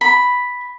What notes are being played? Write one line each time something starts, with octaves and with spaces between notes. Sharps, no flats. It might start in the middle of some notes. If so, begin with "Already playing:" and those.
B5